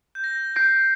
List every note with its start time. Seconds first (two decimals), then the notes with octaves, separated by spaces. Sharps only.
0.15 G6
0.24 A#6
0.56 G6 A#6 C7 D7